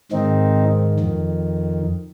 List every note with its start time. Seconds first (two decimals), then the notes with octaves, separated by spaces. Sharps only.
0.12 G#2 D#3 C4 D#4
1.00 F2 D#3